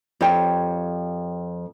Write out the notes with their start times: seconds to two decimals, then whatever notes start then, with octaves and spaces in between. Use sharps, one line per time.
0.21 F2 G4 C#5 G5